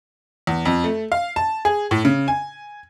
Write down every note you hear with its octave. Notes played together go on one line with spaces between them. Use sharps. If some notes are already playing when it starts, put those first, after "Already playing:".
E2
F2
A3
F5
A5
G#4
A2
C#3
G#5